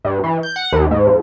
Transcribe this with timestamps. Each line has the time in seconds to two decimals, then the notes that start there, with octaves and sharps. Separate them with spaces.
0.05 G2
0.24 E3
0.43 G6
0.56 F#5
0.73 D#2
0.91 G#2
1.07 F2